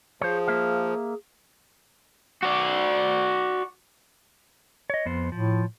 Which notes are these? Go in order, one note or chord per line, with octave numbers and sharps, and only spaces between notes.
F3 G#4 C5 C#5
A#3 E5 F5
F#4 D5
C#5 D#5
F2 B3 C5
A2 F3